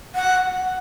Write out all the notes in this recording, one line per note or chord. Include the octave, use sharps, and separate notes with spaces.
F#5